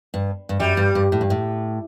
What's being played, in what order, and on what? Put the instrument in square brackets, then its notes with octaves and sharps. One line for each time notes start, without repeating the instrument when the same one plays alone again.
[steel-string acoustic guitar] G2
G2
[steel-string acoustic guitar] F#2 [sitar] G3
[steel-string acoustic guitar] G2
G2
A2
G2
A2